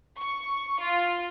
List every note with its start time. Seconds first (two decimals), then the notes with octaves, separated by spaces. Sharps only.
0.18 C#6
0.80 F4